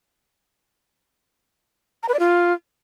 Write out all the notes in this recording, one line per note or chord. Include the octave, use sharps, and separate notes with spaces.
A#5
B4
D5
F4